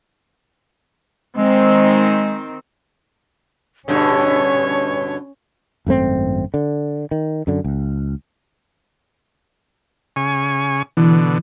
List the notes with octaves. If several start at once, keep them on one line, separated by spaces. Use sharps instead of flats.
D#3 G#3 C4 D#4
G2 B2 D3 C#4 C#5
G#1 F#2 A3 C4
D3
D#3
F#2 D3
C#2
C#3 G#5 C#6
B2 D3 E3